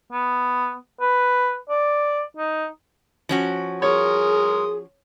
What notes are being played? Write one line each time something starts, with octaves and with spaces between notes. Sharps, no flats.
B3
B4
D5
D#4
F3 C#4 F#4
G#4 A#4 C#5 C6 D#6